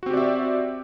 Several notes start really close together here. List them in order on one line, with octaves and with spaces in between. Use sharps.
F#4 C4 G4 D5 E5